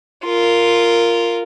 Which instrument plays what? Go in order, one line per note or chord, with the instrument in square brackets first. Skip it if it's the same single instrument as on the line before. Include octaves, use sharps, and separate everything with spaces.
[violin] F4 A#4